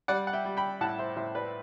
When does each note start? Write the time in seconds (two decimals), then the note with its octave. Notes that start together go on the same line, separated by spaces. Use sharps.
0.08 G3 D5 F#5
0.27 F#5
0.33 E5 G5
0.45 G3
0.57 G5 B5
0.81 A2 F#5 A5
0.98 C5 E5
1.16 A2 C5 E5
1.35 B4 D5